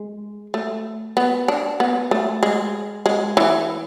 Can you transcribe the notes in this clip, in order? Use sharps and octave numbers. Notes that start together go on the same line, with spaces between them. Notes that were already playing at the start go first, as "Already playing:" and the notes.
Already playing: G#3
A3
B3
D4
B3
A3
G#3
G#3
E3